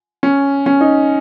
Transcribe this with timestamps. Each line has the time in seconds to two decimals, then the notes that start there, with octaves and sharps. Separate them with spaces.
0.23 C#4
0.66 C#4
0.81 D#4